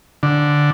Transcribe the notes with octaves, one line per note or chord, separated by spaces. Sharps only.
D3